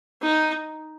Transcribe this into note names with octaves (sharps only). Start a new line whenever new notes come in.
D#4